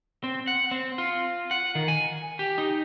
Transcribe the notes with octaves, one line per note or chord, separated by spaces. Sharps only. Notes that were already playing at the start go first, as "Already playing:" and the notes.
C4
F#5
C4
F4
F#5
D#3
G#5
G4
D#4